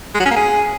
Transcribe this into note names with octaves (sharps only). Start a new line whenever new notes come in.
G#3
F#3
C#4
A#3
G#4